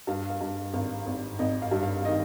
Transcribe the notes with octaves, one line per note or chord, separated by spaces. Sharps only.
G2 F5
F5
G2
G#1 F5
G#1
G#1 D#5
F5
G2
F5
D#3 D#5